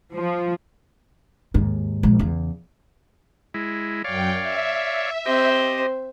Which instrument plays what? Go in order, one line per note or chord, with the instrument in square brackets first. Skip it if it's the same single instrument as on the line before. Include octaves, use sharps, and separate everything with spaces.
[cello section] F3
[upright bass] D#2 G#2
A#1 G#3
E2 C#3
[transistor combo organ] G#3 E4
[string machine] F#2 G5 [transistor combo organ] C#5 D5 F5
[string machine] E5
[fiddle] C4 C5 [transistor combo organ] G4 D#5